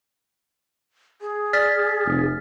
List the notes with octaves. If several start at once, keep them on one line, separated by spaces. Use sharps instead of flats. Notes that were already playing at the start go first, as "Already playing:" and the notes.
G#4
D5 F6 A6 B6
F1